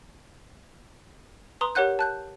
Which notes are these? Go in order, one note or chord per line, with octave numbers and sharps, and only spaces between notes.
B4 A#5 C6 D#6
G4 A#4 C#5 F#5 F#6 G6
A5 F#6 G6